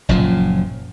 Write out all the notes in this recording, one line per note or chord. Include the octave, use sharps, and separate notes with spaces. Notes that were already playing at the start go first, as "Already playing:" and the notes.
F#1 F#2 A#2 F3